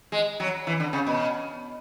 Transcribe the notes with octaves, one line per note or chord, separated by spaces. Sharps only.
G#3
F#3
E3
D3
C#3
B2